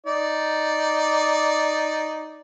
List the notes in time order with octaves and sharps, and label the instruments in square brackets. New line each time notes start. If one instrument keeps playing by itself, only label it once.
[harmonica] D#4 D5